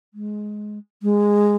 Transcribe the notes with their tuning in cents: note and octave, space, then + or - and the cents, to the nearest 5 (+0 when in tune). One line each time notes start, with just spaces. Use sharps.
G#3 +15
G#3 -10